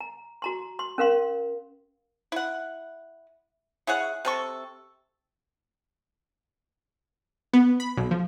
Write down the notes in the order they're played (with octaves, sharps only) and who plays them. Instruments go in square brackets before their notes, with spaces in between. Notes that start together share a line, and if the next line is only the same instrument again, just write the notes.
[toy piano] A#5
F#4 A#5 C6
C6
C#4 A#4 F5 C6
[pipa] E4 F#5
E4 G#4 C#5 F#5
C3 A4 C#6
[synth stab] B3
B5
B1
F3